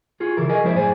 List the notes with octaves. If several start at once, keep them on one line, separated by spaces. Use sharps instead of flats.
F4 F#4 G#4
C#3 E3 A4 A#4
F#4 G#4 A#4 B4 D#5 G#5
F2 F3 G#3 E4 C5 D5
F#2 A2 G#4 C5 D5 G#5